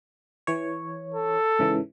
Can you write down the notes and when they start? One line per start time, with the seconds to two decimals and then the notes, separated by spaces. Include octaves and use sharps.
0.47 E3 C#5
1.14 A4
1.59 G#2 C#3 E3